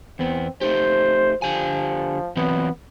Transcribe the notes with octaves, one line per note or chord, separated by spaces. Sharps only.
E2 B3 C4
A3 D#4 G4 C5
D3 F3 G4 G#5
E3 F#3 B3 C4